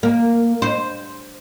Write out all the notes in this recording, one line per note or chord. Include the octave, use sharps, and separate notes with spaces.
A#3
C5